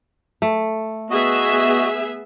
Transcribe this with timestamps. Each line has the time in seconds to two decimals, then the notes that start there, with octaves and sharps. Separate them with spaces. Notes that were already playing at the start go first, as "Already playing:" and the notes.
0.42 A3
1.10 B3 F#4 G#4 D#5 E5